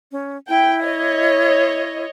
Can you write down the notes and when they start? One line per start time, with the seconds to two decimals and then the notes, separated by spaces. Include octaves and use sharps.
0.12 C#4
0.49 E4 G5
0.85 C#5 D#5